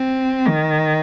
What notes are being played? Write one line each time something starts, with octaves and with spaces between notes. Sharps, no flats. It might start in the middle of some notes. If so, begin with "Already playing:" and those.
Already playing: C4
D#3